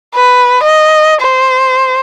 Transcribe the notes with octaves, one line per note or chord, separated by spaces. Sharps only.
B4
D#5
C5